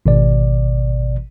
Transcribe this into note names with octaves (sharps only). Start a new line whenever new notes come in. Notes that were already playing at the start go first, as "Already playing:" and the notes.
G#1 B2 D5